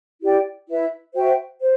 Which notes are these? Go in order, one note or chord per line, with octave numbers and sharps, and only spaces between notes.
E4 G4 D5 G5
E4 B4 E5
F#4 C5 E5 G5
C5